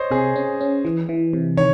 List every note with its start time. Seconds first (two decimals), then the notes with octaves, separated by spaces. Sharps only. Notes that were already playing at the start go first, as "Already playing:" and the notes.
Already playing: C5 C#5 D#5
0.11 C3 G#4
0.36 C#4
0.61 C#4
0.85 E3
1.09 E3
1.33 C3
1.57 D#3 C#5